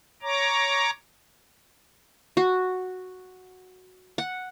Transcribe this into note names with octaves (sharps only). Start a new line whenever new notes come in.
C#5 A#5 D6
F#4
F#5